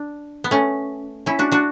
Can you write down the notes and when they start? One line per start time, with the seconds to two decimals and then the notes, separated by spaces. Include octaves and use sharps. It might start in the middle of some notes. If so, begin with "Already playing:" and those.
Already playing: D4
0.44 B3
0.51 A3 C#4
1.26 C#4 E4
1.39 D4 F#4
1.52 D4 F#4